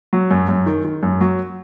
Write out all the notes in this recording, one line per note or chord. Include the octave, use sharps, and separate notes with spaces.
F#3
F#2
F#2
D#3
D#3
F#2
F#3